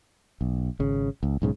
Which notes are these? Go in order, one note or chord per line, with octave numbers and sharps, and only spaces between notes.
B1
G#1 C#3
C#2
B1 G#2 C#3